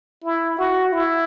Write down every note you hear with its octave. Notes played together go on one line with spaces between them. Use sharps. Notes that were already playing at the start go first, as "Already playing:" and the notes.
E4
F#4
E4